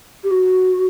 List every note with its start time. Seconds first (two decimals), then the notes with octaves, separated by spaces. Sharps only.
0.23 G4
0.31 F#4